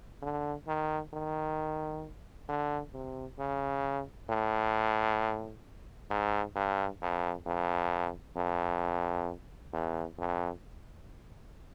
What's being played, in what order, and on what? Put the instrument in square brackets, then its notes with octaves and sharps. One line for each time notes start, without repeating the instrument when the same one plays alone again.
[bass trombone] D3
D#3
D#3
D3
C3
C#3
A2
G#2
G2
F2
F2
F2
E2
F2